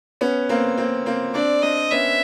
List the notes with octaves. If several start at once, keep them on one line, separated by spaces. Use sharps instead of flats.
B3 C#4
A#3 C4
A#3 C4
A#3 C4
C4 D4 D5
C4 D4 D#5
B3 C#4 E5